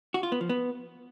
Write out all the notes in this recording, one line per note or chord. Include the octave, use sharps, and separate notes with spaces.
F#4
F4
B3
F3
B3